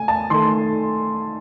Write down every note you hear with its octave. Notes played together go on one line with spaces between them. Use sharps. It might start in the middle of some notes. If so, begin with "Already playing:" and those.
Already playing: A3 G#5
A5
D#3 A3 C6